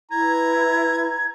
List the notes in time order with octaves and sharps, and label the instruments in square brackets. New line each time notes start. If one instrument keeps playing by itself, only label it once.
[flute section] E4 B4 [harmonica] A#5 [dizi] G#6